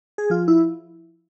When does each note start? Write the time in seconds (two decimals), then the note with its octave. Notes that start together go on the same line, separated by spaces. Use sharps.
0.18 G#4
0.30 F3 F4
0.48 E4